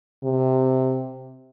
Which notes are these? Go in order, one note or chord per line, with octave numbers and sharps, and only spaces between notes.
C3